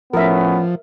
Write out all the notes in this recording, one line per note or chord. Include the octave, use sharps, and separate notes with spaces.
A2 F3 B3 C#4 A#4 E5